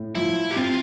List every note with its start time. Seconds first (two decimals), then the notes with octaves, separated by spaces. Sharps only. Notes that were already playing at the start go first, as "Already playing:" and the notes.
Already playing: A2
0.15 F3 E4
0.51 G4
0.56 C4 F4